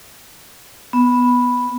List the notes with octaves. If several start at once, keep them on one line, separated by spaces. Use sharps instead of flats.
B3